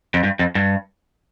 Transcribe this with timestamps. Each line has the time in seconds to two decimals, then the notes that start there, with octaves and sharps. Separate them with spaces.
0.14 F2
0.23 G2
0.39 F2
0.55 G2